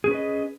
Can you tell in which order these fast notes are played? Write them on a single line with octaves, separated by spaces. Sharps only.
G#4 C#4 B4 D#5